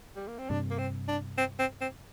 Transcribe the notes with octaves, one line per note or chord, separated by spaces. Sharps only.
G3
A#3
C4
G2 C3 D4
A#3
C4
D4
C4
C4
C4